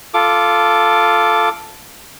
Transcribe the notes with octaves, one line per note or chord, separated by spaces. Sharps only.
F4 A4 D6